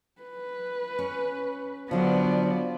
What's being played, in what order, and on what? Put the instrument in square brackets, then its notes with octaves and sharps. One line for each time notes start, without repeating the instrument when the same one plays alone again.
[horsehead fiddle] B4
[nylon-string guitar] C#4
[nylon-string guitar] D3 F#3 [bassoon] F3 [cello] B3 [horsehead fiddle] D5